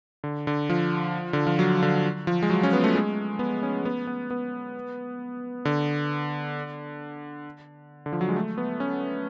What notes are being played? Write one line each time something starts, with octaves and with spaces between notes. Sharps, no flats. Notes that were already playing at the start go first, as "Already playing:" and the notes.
D3
D3
F3
D3
F3
F#3
D3
F3
G#3
F#3
C#4
B3
A3
G#3
B3
C#4
B3
B3
B3
D3
D3
F3
F#3
G#3
A3
B3
C#4